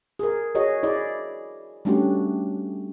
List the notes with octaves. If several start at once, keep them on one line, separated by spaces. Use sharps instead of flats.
G#4 A#4
F#4 G#4 C#5 D#5
E4 G#4 D5 D#5
G3 A3 C#4 D4 F#4 G4